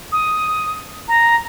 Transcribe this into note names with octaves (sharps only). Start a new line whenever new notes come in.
D#6
A#5